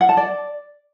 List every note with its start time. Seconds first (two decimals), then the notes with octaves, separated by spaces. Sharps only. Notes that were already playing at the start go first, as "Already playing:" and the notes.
0.01 F#5
0.09 A5
0.17 D5